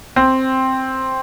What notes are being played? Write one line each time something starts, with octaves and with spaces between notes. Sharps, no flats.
C4